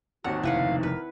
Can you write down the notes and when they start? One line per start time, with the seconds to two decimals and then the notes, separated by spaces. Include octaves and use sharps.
0.24 G#1 D#2 D#3 F#4 F#5
0.43 F1 C#3 F3 E4 B4 F5 F#5
0.83 A#4 B4